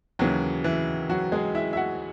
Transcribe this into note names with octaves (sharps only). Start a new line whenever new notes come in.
D#2 C#3 E3 F#3 F#4
E3 E4
F#3 F#4
G#3 G#4
E4 E5
E5
F#4 F#5